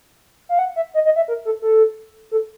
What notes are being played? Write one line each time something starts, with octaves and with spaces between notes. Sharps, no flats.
F5
F#5
E5
D#5
D#5
E5
A#4
A4
A4
A4